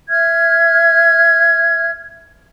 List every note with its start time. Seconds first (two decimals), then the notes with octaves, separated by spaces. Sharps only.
0.09 E5 F6 G#6